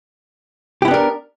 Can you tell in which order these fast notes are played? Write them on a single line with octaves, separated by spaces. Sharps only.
G4 E4 B3 D4 A#4